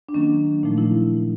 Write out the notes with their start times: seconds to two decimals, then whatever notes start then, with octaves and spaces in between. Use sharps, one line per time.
0.09 D4
0.14 D#3 F#3 A#3 C#4
0.63 A#2 F3 A3 D#4
0.78 E4